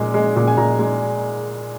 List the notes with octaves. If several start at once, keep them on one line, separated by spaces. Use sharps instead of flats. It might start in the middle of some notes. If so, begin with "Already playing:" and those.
Already playing: A#2 G#3
G#3
A#2
G#5
A#2 A#5
G#3